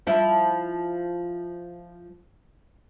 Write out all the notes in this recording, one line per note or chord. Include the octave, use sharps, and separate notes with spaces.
F3 E4